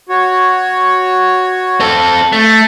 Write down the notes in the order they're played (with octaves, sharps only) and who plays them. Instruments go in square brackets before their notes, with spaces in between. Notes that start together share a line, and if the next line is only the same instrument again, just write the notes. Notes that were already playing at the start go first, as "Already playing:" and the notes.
[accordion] F#4 C#5
[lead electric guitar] C4 A4
A3